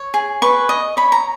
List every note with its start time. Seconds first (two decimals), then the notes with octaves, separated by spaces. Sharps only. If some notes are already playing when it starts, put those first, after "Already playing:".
Already playing: C#5
0.14 G#4
0.42 B4 C#6
0.69 D#5
0.97 C#5 B5
1.12 A#5